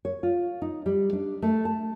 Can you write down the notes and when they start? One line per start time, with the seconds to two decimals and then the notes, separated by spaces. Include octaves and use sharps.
0.05 C#5
0.23 F4
0.62 D#4
0.86 G3
1.13 D4
1.42 A3
1.65 A5